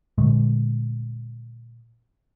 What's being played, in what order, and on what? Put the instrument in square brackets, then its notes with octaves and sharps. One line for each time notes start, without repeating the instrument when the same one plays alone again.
[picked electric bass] A#2 D3 G#3 A3